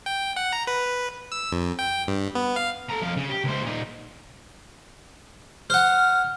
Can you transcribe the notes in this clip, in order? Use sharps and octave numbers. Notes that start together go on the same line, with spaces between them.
G5
F#5
A#5
B4
E6
F2
G5
G2
B3
F5
A4 A#5
F2 F5
C#3
G4
C#2 C5
A#2 D#4
C5 F#5 F6